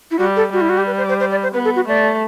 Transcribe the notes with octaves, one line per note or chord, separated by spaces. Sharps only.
E4
G3 F#4
A4
G3 F#4
E4
F#4
G4
B4
C5
C5
C5
D5
C5
B3 B4
A4
F#4
A3 D5